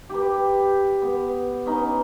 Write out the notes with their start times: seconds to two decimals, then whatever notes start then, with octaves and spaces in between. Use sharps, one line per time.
0.10 G4 B4
1.02 B3
1.66 B3 C#4 D#4